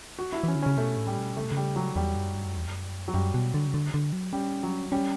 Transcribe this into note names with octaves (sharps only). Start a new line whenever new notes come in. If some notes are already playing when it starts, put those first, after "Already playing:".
F#4
E4
E3 C#4
D3
C#3 C#4
B2 A3
A2
G3
B2
C#3 A3
B2
C#3 G3
F#3
E2 G3
F#2
G2
F#2
E2
F#2
F#3
F#2 G3
B2
D3
C#3
D3
D3
F#3
G3 C#4
F#3
G3 C#4